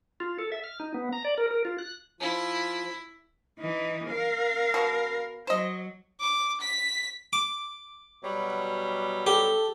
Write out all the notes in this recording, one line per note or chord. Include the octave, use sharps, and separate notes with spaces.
F4
A4
E5
F6
D#4
B3
A#5
D5
A#4
A#4
F4
F#6
F3 E4 F4
E3 D#4
A#4 F5
B2
F#3 C5 D#5
D6
B6
D6
B2 F#3 G3
G4 A4